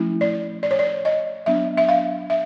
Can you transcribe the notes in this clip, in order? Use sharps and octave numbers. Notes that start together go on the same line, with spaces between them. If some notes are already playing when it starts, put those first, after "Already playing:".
Already playing: F3 A3 C#4 E4
D5
D5
C#5
D5
D#5
F#3 B3 D4 E5
E5
F5
E5